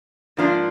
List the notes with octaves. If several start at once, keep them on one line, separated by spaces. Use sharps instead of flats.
G#2 F3 A#3 D4 F4